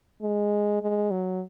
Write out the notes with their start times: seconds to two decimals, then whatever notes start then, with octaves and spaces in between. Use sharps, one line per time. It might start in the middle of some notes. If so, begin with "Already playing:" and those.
0.22 G#3
0.82 G#3
1.11 F#3